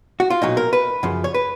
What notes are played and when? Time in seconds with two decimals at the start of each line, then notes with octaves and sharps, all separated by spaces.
0.20 F#4
0.30 F4
0.42 B1 A#2 F#3 D#4
0.57 A#4
0.73 B4
1.03 F#2 C#3 F3
1.24 C#5
1.34 B4